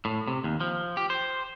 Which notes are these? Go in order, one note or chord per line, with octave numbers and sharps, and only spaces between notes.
A2
C3
D#2
F3
G4
C5